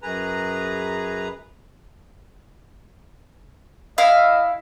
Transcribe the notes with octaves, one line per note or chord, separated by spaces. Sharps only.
F#2 G#4 B4 A#5
E4 D#5 F5